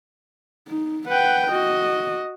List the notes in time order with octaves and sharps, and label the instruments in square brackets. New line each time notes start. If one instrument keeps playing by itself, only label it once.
[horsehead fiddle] D#4
[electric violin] B4 G5 [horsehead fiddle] F#5
[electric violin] F#4 [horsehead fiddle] D#5